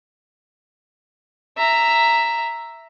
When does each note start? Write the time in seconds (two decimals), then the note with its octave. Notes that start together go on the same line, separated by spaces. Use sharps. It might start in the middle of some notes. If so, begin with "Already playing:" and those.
1.57 E5 A#5